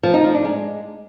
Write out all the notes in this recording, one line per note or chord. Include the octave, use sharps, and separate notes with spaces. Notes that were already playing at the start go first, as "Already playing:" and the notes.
F3
D#4
F3
D4
G#3